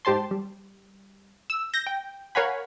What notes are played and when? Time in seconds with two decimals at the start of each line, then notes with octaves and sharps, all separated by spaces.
0.05 G#2 G4 C5 A5 C6
0.31 G3
1.50 E6
1.74 G6 A#6
1.87 G5
2.35 A#4 C#5 F5 F#5 G#5 B5